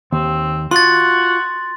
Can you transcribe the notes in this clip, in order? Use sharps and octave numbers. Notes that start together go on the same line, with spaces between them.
D#2 C4
F4 F#4 C6 A6